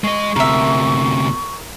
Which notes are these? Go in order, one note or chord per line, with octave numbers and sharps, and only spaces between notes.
G#3 D#5 C#6
D2 C3 A#4 E5